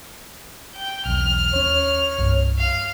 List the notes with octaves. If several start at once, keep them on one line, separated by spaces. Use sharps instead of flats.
G5
B1 E2 F6
D#2 C#4 C#5
C2 G2 C3
F5